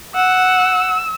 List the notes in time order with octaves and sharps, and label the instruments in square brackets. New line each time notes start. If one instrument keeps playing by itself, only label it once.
[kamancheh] F#5 [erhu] E6